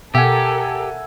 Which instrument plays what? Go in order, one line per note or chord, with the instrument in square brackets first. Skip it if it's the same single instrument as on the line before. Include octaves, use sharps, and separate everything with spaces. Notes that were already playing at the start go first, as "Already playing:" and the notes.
[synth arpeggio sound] B2 [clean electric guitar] G4 [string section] A4 A#4 [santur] E5 F#5 G#5